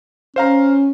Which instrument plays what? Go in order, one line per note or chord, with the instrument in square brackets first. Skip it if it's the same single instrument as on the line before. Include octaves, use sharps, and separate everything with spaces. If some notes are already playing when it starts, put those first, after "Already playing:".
[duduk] C#4 [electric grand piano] C5 F5 A#5